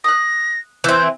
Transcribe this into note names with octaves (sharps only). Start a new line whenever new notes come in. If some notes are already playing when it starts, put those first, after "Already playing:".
D#6 F#6 A#6
E3 C4 G6